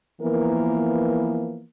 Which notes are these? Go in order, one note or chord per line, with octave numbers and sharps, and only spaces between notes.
E3 F3 A#3 B3 A#4